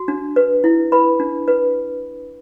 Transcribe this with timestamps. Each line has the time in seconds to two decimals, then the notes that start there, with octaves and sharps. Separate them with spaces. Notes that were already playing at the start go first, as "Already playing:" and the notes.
Already playing: F#4
0.08 D4
0.36 B4
0.64 E4
0.92 B4 B5
1.20 D4
1.48 B4